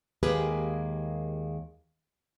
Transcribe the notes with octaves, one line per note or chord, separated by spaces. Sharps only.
D#2 G#3 A#3 G4 G#4 B4